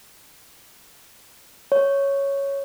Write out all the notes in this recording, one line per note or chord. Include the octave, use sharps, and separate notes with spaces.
C#5